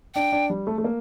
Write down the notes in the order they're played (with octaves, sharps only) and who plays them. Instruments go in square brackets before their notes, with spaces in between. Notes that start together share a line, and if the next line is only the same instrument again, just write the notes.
[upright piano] D4 [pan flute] G5
[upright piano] D4
G3
A3
A3
A#3